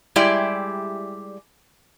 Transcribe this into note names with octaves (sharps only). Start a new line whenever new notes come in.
G3 G#3 E4 G4 D5 E5